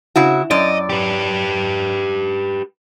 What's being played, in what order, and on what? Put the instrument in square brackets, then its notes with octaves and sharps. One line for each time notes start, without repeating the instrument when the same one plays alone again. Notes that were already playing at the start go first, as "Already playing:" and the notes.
[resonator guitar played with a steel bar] C#3 E4 F#4
[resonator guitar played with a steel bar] F#2 D5 [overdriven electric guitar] D#5
[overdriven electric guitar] G4 B4